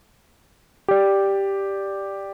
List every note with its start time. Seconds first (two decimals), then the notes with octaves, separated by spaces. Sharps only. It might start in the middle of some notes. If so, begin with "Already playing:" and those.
0.88 G4 D5